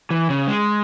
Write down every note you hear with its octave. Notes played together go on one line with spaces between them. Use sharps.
E3
C#3
G#3